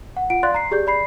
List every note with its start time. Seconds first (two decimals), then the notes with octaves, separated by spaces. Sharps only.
0.17 F#5
0.30 F4 F#5 D7
0.43 D5 F5 C6 F#6 A6
0.54 A#5 C7
0.71 G4 G#4 D5 G6
0.87 D5 B5 C7